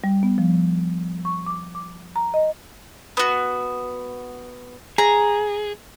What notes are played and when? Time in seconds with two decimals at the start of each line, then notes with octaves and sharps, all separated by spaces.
0.04 G3
0.23 B3
0.38 F3
1.25 C#6
1.46 D6
1.75 D6
2.16 A#5
2.34 D#5
3.17 B3 F#4
4.98 G#4 A#5